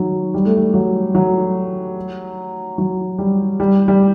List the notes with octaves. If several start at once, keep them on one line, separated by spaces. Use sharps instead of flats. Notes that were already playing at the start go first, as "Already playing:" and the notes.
Already playing: D#3 F#3
G3
A3
G3
F#3
F#3
F#3
G3
G3
G3